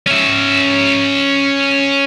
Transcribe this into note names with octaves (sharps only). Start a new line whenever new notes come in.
C#4 E5